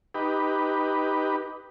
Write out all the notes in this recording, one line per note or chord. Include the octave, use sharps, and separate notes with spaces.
D#4 G4 B4